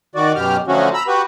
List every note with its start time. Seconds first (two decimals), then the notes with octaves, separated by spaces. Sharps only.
0.15 D#3 F#4 D5
0.35 F#2 B2 G4 F6
0.68 D3 F3 F#3 A3 C#4 F#4
0.94 A#5 B5 E6
1.08 F#4 G4 B4